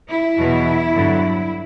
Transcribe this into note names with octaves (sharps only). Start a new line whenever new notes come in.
E4
E2 B2 F#3
G2 D3 F#3